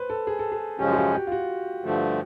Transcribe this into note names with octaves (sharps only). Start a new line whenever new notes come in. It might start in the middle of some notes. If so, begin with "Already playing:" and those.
Already playing: B4 C5
A4
G#4
A4
G#4
F#2 C#3 F3 G#3 C#4 G4
F#4
G4
G4
F4
F#4
G2 D3 F3 A3